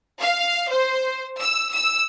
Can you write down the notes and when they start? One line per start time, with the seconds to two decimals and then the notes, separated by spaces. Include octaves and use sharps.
0.21 F5
0.71 C5
1.39 E6
1.73 E6